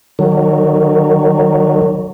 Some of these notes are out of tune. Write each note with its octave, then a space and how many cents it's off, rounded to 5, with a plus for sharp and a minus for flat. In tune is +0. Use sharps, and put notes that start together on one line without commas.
D#3 -30 F#3 +0